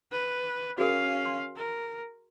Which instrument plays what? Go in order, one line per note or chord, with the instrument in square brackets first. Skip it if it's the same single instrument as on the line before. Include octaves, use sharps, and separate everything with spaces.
[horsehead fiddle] B4
[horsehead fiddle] C#4 F5 [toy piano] F#4 G#4 A#4
[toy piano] C6
[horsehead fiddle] A#4